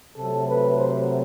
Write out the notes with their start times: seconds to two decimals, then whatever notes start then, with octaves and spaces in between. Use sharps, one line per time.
0.16 C3 F#3 A3 A4
0.46 B4
0.76 C5